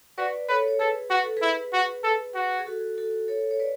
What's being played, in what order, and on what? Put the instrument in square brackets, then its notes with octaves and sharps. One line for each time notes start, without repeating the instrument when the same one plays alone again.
[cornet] F#4 [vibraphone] B4 D5
[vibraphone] A4 C#5 [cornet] B4
[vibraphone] C#5
[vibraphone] G#4 B4 [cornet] A4
[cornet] F#4 [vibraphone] B4
[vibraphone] A4
G#4 B4
[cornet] E4
F#4
A4
F#4
[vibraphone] G#4
F#4 A4
F#4 A4
A4 C#5
C#5
B4 D5